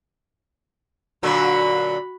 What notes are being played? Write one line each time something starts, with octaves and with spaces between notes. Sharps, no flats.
A#2 D3 F#3 F#4 B5